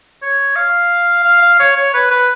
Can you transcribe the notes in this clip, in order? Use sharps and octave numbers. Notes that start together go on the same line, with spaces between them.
C#5
F5
F5
F5
C#5
C#5
B4
B4